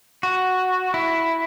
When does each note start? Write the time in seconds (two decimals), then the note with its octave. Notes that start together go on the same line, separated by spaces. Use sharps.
0.23 F#4
0.94 E4